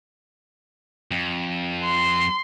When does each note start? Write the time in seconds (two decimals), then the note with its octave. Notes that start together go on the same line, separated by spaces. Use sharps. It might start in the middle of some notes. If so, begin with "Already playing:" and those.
1.11 F2
1.83 C6